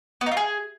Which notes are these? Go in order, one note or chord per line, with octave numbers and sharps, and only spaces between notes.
B3
D#4
F4
G#4